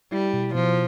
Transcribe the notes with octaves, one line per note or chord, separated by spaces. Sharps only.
G3 E4
B2
B2 F3